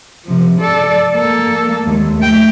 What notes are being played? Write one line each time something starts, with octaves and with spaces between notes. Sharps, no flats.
C3 F3
A4 D5
A#3 A4
D#2 G#3
A3 G5